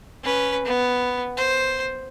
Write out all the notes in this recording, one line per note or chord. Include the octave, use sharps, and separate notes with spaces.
C#4 B4
B3
C5